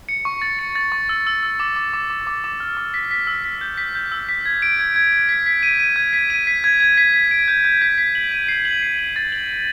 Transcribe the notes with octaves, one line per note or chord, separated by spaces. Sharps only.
C#7
C#6
A6
C#7
A6
C#6
E6
E6
E6
D6
D6
D6
D6
D6
D6
F6
D6
B6
B6
E6
B6
G6
B6
G6
E6
B6
G#6
D7
G#6
G#6
G#6
B6
B6
D#7
D#7
G#6
B6
D#7
B6
G#6
G#6
B6
B6
D7
G6
G6
B6
B6
F#7
D#7
C7
F#7
C7
F#7
A6
F#7
F#7